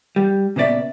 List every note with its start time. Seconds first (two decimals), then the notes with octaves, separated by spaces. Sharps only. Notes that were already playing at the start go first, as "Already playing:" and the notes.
0.16 G3
0.56 A#2 C#3 B3 C#4 D5 E5